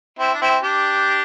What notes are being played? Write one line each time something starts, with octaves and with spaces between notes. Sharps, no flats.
C4 E4
D4
C4 E4
D4 G4